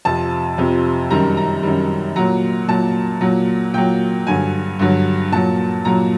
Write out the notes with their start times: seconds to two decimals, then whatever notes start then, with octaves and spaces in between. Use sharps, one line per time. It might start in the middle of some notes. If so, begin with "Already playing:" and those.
0.05 F2 C3 F3 A5
0.58 F2 C3 F3
1.10 F#2 D#3 G3 A#5
1.37 A#5
1.63 F#2 D#3 G3
2.16 A#2 F#3 A#5
2.68 A#2 F#3 A5
3.21 A#2 F#3
3.74 A#2 F#3 G5
4.27 G2 D3 F#3 G#5
4.79 G2 D3 F#3
5.32 A#2 F#3 A5
5.85 A#2 F#3 A#5